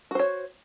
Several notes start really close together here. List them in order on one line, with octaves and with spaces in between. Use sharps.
F#4 C5 C#5